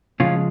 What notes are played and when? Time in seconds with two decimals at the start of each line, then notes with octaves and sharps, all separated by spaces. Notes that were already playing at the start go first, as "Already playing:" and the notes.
0.20 C#3 F3 G#3 C#4 F4